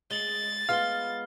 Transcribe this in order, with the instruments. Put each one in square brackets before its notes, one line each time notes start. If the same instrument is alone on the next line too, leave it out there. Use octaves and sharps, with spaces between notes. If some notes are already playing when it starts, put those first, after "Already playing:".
[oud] G#3 [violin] A6 [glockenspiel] F#7 G7
[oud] G#3 B3 F4 [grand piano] F5 [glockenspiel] F6 G7